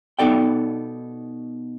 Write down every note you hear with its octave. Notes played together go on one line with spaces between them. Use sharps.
B2 B3 D#4 A4 D5 G5